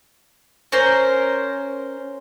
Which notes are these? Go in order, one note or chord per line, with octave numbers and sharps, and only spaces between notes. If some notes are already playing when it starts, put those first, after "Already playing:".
C#4 A#4 C5